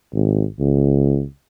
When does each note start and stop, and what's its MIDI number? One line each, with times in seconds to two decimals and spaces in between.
0.14 0.44 32
0.59 1.23 37